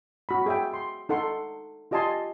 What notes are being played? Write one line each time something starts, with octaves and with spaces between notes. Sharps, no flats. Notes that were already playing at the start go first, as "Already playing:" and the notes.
F#4 B5
G#4 E5 G5
C6
D#4 A4 F#5 C6
F4 G4 D#5 G#5 A5 C6